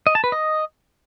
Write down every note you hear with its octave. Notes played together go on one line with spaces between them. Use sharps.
D#5
A5
B4
D#5